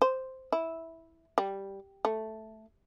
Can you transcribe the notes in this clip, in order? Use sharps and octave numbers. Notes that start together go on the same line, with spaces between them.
C5
E4
G3
A3